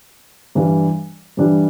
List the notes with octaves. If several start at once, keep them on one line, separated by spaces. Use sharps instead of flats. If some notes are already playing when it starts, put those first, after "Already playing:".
G2 E3 G3 D4
G2 E3 G3 D4